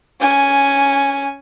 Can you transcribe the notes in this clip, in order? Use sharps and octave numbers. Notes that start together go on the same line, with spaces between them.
C#4 G#5